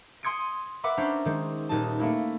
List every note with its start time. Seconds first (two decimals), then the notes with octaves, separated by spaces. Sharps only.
0.23 G#5 C6 D#6 G#6 C#7 D7
0.83 A#4 B4 E5 F#5 B5 D6
0.97 C#4 D4 C5 A#5
1.25 D#3 G#3
1.69 D#1 D#4 A5
2.00 A3 A#3 E4